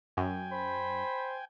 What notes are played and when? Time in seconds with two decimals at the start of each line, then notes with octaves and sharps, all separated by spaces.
0.17 F#2 G5 G#5
0.52 C5 B5